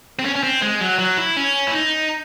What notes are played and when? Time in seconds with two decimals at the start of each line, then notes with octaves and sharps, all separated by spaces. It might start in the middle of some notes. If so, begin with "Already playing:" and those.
0.19 C4
0.25 C#4
0.36 C#4
0.43 C4
0.62 G#3
0.81 F#3
0.99 F#3
1.18 E4
1.37 C#4
1.67 E4
1.73 D#4